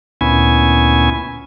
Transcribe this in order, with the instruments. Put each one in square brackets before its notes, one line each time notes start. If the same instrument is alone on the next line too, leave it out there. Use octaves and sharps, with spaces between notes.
[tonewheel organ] D2 A#2 B3 C#4 E4 G#5